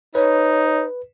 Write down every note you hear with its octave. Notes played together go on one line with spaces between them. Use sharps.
D#4 B4 C#5